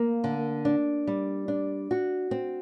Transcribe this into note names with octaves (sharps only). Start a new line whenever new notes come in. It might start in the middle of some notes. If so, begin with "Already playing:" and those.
Already playing: A#3
D3
D4
G3
D4
F#4
C4